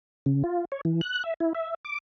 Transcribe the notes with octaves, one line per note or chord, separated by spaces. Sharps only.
C#3
F4
C#5
E3
F#6
E5
E4
E5
D6